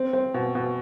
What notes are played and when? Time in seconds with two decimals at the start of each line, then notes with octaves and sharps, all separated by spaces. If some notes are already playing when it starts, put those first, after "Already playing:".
Already playing: C4
0.13 C4
0.34 B2
0.55 B2